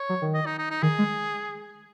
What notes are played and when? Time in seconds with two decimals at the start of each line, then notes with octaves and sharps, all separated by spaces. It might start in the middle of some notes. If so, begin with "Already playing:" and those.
Already playing: C#5
0.09 F#3
0.22 D#3
0.34 D#5
0.46 D#4
0.58 D#4
0.70 D#4
0.83 D#3 G#4
0.99 G#3